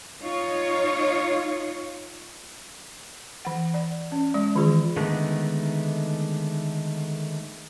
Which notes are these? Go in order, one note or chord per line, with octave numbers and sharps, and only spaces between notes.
D#4 F4 C#5
E3 F#5
D5
C#4
G#3 D5
D#3 E3 F4 G#4
D3 D#3 G#3 A3 B3